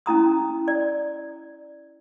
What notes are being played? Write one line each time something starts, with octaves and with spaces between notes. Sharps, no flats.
C#4 E4 A#5 D#6
D5